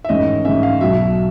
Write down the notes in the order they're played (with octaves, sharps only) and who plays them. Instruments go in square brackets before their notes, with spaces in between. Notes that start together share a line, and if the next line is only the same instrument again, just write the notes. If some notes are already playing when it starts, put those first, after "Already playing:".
[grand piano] E5
A1 G#2 D#3 G#3 C#4 D#5
A1 G#2 D#3 G#3 C#4 E5
F5
B1 B2 F#3 E5